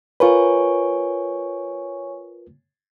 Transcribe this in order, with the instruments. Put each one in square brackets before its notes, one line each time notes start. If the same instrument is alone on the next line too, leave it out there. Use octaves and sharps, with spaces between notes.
[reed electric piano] F4 A#4 B4 [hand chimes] C#5 G#5 C#6